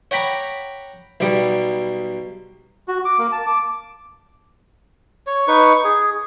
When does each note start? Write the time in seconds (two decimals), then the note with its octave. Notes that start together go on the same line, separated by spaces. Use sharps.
0.11 C#5 F#5 G5 A#5 B5 D6
1.20 B1 B2 G3 D6
2.88 F#4
3.05 D6
3.18 A#3
3.32 A5
3.47 D6
5.27 C#5
5.48 D#4 B4 C#6
5.84 G#4